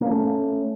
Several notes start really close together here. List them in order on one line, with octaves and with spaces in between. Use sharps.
A#3 C#4 A3